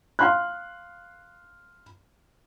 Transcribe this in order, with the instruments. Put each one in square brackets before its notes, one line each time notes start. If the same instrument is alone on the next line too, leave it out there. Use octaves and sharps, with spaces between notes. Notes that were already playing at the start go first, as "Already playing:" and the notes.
[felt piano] F5 C6 F#6